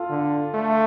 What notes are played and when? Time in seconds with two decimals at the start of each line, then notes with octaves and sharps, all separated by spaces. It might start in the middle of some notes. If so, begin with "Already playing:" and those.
Already playing: F4 A4
0.10 D3
0.54 A3